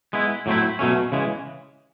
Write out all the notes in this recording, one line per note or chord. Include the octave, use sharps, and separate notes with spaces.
G#3 B3 E4
A2 F#3 A3 C4 E4
B2 F#3 A3 C#4
C#3 E3 G#3